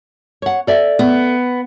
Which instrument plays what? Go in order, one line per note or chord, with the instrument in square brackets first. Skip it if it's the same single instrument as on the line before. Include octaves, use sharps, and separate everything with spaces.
[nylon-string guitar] C#5 F#5
A4 D5 E5
[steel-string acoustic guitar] B3